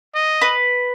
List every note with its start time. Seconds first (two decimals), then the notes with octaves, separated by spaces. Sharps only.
0.15 D#5
0.42 B4